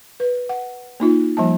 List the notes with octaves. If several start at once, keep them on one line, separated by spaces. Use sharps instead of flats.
B4
F#5
A#3 D#4 F4
F3 G3 A#3 A5